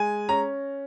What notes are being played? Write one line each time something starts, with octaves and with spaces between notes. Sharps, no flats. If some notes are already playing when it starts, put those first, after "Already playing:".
Already playing: G#3 G#5
C#4 A#5